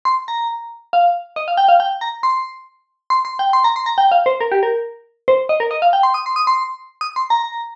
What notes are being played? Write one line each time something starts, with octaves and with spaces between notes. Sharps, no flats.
C6
A#5
F5
D#5
F5
G5
F5
G5
A#5
C6
C6
C6
G5
C6
A#5
C6
A#5
G5
F5
C5
A#4
G4
A#4
C5
D#5
A#4
D#5
F5
G5
C6
D#6
C6
D#6
C6
D#6
C6
A#5